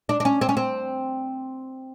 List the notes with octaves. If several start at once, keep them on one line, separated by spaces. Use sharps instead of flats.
D4
D4
C#4
C4
C#4
C4